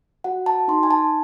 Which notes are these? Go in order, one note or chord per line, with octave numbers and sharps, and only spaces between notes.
F#4 F#5
A5
D#4 C6
G#5
A5